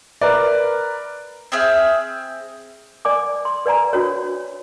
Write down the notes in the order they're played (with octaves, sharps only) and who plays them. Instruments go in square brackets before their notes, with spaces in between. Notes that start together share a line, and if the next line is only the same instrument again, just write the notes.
[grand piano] A#4 B4 D5
[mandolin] C4 G#4 E5 F6
[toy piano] D5 G#5 D6
C6
B4 D5 G#5 A#5
D4 F#4 C#5